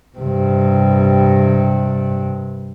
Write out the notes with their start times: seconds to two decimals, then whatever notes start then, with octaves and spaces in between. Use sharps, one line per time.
0.18 G2 C3